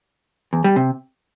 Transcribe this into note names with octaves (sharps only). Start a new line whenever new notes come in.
E2
G3
C3